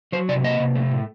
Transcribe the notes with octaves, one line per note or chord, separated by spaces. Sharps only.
F#3 C5
C3 D5
A#3 D#5
C3
A3
A2